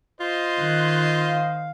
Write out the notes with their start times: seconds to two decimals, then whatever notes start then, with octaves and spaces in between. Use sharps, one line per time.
0.20 F4 C5 D#5
0.59 D#3 F#6
1.18 F5